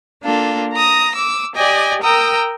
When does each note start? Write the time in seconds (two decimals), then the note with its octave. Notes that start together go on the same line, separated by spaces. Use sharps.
0.23 A#3 D4 F4 A4
0.74 A#5 D#6 A#6
1.14 D6 E6
1.54 G4 D5 D#5 G5 G#5
2.01 A#4 G5 A#5 D#6 E6